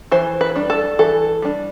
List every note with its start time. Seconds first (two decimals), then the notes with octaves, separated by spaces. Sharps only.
0.11 E3 C5
0.41 B4
0.56 G3 D4
0.70 A4
0.99 E3 A4
1.42 G3 D4